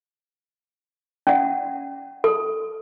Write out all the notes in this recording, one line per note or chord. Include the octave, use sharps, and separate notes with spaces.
C#4 F#5
A4